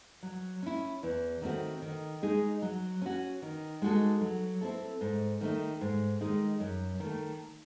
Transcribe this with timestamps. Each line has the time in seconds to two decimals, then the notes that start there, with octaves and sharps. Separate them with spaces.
0.23 F#3
0.63 C#4 E4
1.03 E2
1.42 D#3 A3 C4 F#4
1.82 D#3
2.22 G#3 D#4 G#4
2.62 F#3
3.02 C#4 F#4
3.42 D#3
3.82 G#3 D#4 F#4 A4
4.21 F#3
4.61 C4 E4 A4
5.01 G#2
5.41 D#3 A3 D#4
5.81 G#2
6.21 D#3 G#3 D#4
6.60 F#2
7.00 D#3 A3